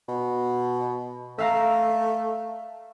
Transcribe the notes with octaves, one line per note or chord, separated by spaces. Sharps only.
B2
A3 E5 F5 A#5